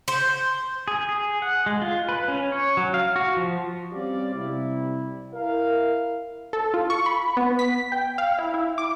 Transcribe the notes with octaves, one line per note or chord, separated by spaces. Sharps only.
C5
G#4
G#4
F#5
G#3
F4
B4
C#4
C#5
F#3
F5
F#4
F3
G3 C4 C#4 G4 D5 F5
C3 G3 E4
E4 A#4 F5
A4
F4
C#6
B5
B3
B6
G5
F5
E4
E4
D6